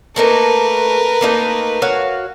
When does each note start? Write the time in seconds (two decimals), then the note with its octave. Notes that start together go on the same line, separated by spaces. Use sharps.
0.16 A3 A#3 D#4 A#4 B4
1.21 A3 A#3 D#4
1.82 F#4 C#5 F5